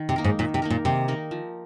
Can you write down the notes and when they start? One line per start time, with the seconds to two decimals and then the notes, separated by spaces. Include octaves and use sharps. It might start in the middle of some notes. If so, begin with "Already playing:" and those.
Already playing: D#3
0.09 C3
0.16 A#3 D#4 A#4
0.24 G#2
0.39 A#2 D#3
0.54 C3
0.62 A#3 D#4 A#4
0.70 A#2
0.85 C3 D#3
1.08 A#3 D#4 A#4
1.31 F3